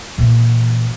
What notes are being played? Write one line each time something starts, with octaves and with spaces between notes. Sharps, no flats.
A#2 E3